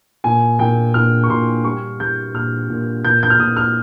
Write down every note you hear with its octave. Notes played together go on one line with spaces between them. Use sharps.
A#2 G#5
A#2 G5
A#2 F6
C#6
A#2 C6
G3 C#6
G3 G6
A#2 F6
A#2
A#2 G6
G6
F6
A#2 D#6
F6